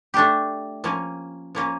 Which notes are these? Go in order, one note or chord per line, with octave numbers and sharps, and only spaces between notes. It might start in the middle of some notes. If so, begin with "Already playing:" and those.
A3 D4 G4
F3 A#3 C#4
F3 A#3 C#4